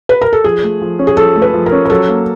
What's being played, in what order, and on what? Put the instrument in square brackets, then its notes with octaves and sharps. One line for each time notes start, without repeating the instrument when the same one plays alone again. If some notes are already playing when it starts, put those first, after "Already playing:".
[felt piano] B4
A#4
A4
[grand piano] F3 [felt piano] G#4
[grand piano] A3
F3
C#4
[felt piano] G#4
[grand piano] F3 [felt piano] A4
[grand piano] A3
[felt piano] B4
[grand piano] F3
[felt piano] A#4
[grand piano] C#4
[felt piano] A#4
[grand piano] F#3 [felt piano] A4
[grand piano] A#3